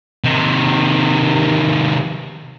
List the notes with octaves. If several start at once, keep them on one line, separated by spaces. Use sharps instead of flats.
C3 D#3